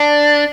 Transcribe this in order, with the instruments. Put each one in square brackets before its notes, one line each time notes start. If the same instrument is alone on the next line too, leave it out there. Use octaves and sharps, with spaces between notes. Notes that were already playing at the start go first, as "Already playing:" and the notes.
Already playing: [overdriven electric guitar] D4